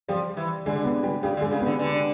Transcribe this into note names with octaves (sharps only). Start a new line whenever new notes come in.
F3 G3 G4
E3
D3 G#3 G#4
B3 B4
G3 G4
C#3 G3 G4
D3
G#3 G#4
C#3
B3 B4
D3
D3